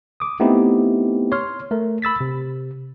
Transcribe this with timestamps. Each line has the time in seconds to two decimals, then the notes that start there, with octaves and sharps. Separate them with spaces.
0.20 D6 D#6
0.40 A3 B3 C4 D#4 E4 G4
1.32 C#5 C6 F6
1.71 A3 A#4
2.02 B5 E6 A6 B6
2.20 C3